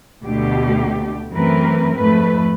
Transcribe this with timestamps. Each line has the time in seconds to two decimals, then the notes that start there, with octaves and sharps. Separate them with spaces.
0.23 D2 B2 D3 A3 G4
1.32 F#2 E3 A3 C4 A#4 B4
1.96 F2 G#2 A3 B4